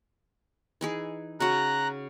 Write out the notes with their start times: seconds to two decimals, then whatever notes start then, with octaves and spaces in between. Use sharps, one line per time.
0.81 E3 D#4 G#4
1.40 C#3 F#4 A#5 F#6